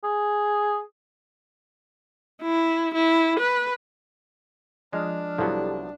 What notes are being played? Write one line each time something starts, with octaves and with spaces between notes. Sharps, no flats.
G#4
E4
E4
B4
F3 G#3 D4 D#5 F6
C2 F3 F#3 B3 G4 A4